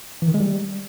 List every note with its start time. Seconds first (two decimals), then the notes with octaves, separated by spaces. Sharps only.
0.22 E3
0.28 D#3
0.34 G#3
0.40 G3